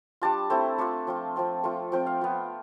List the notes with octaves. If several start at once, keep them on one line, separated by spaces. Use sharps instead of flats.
G3 D4 F4 A5
A3 C4 E4
A3 D4 F4 A5
F3 C4 F4
F3 C4 F4
A3 C4 F4
F3 C4 F4 G5
F5
B3 F4